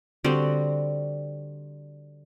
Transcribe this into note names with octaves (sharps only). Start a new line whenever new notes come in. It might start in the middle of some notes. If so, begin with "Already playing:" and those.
D3 G3 C4 F#4